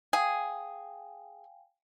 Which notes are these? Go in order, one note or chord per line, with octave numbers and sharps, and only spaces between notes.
G#4 F5 G5 G#5